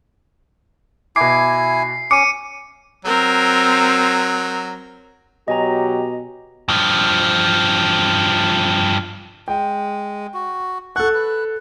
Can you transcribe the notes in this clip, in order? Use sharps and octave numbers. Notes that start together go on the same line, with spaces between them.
B2 E4 G#5 D6 C7
C#4 D6 C#7 D#7
F#3 C4 A#4
B2 F#3 G4 D#5 G#5 A#5
G2 F3
G#3 G5
F#4
A4 F#5 C#6 F#6
B4